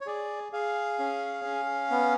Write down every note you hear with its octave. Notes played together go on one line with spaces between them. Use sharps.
C#5
G#4 D5
G#4 F5
C#4
C#4
B3